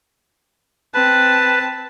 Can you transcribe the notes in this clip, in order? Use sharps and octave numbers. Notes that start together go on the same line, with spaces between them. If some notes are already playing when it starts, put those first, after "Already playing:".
C4 B4 A5